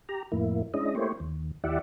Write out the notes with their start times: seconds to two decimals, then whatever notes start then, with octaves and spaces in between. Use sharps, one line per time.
0.09 G4 A#5
0.32 F2 A2 A#3 E4
0.74 G#3 C#4 D4 E4 D#5
0.95 A3 A#3 E4 G4 C5 C#5
1.20 D#2
1.64 D#2 E4 G4 D5 E5 F#5